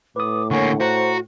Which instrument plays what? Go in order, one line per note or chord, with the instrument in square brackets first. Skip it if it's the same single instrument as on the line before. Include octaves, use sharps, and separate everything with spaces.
[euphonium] A2 [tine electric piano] B4 D#6 [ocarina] D6
[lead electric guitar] D3 A#3 [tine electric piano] C#5 G#5 C#6 [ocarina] F#5
[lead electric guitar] F#4 [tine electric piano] C5 [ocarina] A#5